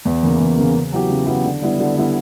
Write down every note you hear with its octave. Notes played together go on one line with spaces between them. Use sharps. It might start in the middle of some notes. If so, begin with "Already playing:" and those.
E2
C#3 E3 A#3
E2
C#3 E3 A#3
C#3
F#3 B3 E4 G4
C#3
F#3 B3 E4 G4
D3
G3 B3 E4
D3
G3 B3 E4